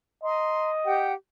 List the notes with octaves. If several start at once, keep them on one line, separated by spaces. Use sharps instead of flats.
D#5 A#5 C6
G4 F#5 G5